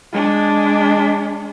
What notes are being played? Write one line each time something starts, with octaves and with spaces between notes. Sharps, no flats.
G#3 D4